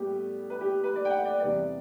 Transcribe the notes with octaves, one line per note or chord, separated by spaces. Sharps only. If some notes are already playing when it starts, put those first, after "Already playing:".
Already playing: A2 G3 B3 G4
B4
G4
B4
D5
G5
F#5
D5
E2 C3 G3 B3 D5